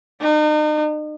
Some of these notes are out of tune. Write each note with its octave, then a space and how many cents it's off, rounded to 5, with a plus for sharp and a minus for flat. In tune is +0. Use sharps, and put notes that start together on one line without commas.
D#4 -40